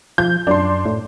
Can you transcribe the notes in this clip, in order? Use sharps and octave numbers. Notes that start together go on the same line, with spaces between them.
F3 G6
F#2 D4 C6
A2